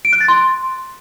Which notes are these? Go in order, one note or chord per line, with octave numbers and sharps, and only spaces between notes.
D7
F#6
A6
C6